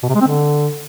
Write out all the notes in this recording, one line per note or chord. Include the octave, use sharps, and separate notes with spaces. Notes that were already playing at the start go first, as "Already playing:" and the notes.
B2
C3
G#3
C4
D3